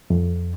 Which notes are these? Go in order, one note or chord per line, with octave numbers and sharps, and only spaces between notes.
F2